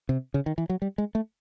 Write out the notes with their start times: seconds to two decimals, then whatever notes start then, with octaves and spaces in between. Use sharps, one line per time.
0.09 C3
0.34 C#3
0.46 D#3
0.58 E3
0.69 F#3
0.82 G3
0.98 G#3
1.15 A3